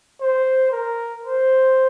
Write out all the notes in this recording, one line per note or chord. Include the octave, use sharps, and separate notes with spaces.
C5
A#4
C5